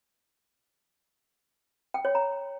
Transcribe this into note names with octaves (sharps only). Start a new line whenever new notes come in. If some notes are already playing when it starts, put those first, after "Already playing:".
G5
C#5
A#5